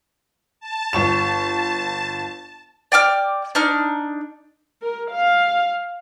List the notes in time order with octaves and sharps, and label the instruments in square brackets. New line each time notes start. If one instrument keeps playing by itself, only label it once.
[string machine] A5
[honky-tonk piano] G1 C#6 E7
[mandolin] D5 G5 D6 F6
D4 D#4 F6
[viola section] A#4
F5